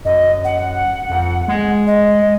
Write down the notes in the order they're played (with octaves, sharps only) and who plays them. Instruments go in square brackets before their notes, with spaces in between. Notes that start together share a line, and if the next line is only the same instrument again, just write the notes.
[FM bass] F#2 [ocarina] D#5
[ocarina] F#5
[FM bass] F2
G#3
[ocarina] D#5